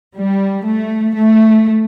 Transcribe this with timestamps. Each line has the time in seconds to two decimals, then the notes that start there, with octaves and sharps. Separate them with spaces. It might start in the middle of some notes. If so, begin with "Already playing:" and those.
0.16 G3
0.65 A3
1.15 A3